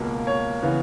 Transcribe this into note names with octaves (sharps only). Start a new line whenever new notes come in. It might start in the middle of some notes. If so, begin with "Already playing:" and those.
Already playing: C#2 B2 A#3 A#4
C#5
C#3 E3 B3